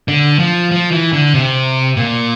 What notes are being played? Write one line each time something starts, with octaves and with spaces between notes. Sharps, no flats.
D3
F3
F3
E3
D3
C3
A#2